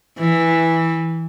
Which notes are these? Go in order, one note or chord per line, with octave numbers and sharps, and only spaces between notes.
E3